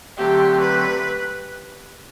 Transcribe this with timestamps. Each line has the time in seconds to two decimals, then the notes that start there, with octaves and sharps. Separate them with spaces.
0.17 D3 F#3 A3 C4 G4
0.61 B4